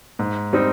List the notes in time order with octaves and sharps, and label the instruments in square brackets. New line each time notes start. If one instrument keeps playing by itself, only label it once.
[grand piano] G#2
G3 C4 D#4